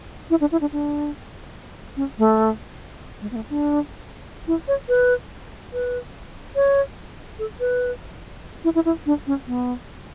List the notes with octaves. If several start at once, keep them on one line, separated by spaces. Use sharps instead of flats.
E4
D4
E4
D4
D4
C#4
A3
G#3
B3
A3
D4
E4
C#5
B4
B4
C#5
A4
B4
E4
E4
E4
D4
C#4
B3